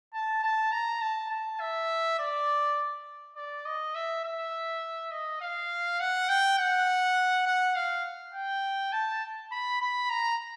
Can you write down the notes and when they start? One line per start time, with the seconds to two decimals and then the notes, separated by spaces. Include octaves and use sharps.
0.14 A5
0.43 A5
0.72 A#5
1.02 A5
1.31 A5
1.60 E5
2.19 D5
3.36 D5
3.65 D#5
3.95 E5
4.24 E5
5.12 D#5
5.41 F5
6.00 F#5
6.29 G5
6.58 F#5
7.47 F#5
7.76 F5
8.34 G5
8.93 A5
9.52 B5
9.81 B5
10.10 A#5